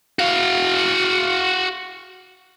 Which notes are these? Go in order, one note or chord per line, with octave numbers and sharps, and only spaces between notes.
F#4 F5